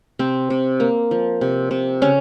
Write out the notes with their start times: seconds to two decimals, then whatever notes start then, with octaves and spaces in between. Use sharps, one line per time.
0.19 C3 C4
0.50 C3
0.80 A#3
1.11 F3
1.41 C3
1.71 C3
2.02 C#3 C#4